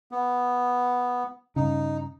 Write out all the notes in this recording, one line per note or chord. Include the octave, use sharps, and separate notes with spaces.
B3
G2 C#3 D#4